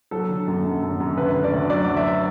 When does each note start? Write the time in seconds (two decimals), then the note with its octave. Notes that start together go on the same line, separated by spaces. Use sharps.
0.11 F#3 A4
0.29 D3
0.48 F#2
0.64 F#2
0.82 F#2
1.00 F#2
1.17 D2 B4
1.35 D3
1.44 D5
1.53 D2
1.69 F#3 D5
1.87 F#3
1.97 E5